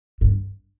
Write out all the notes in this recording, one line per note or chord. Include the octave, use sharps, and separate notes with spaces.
G2